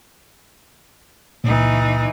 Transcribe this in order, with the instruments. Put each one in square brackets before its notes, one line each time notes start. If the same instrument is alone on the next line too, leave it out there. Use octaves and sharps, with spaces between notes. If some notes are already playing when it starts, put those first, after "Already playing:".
[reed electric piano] C#2 A#2 [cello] E3 D#4